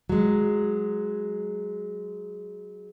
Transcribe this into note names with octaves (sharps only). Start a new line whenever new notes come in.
F#3 G#3